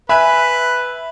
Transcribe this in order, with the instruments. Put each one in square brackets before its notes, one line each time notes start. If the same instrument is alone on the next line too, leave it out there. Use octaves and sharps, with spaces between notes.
[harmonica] B4 [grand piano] E5 G#5 F#6 [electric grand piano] B5